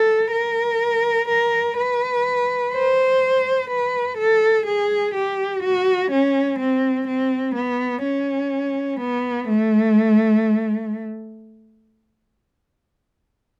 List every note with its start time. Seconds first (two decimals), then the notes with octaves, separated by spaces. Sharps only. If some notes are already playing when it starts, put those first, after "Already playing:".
Already playing: A4
0.32 A#4
1.28 A#4
1.77 B4
2.73 C5
3.70 B4
4.17 A4
4.66 G#4
5.14 G4
5.63 F#4
6.11 C#4
6.59 C4
7.07 C4
7.55 B3
8.03 C#4
9.00 B3
9.48 A3